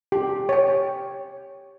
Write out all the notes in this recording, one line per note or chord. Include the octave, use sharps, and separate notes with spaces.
G4
C#5 G5